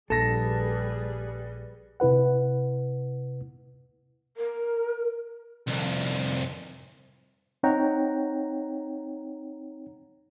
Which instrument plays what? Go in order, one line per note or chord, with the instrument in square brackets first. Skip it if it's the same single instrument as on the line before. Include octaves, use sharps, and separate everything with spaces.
[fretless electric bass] A#1 [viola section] G3 G#4 B4 [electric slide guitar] A4 [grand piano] A#6 E7
[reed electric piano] C3 E4 B4 F#5
[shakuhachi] A#4
[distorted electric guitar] C2 F2
[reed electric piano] C4 D#4 C#5 F#5 G5 A#5